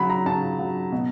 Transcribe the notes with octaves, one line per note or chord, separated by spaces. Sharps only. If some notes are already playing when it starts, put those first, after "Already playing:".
Already playing: C#3 F#3 B5
A#5
C#3 A5
F#3
B2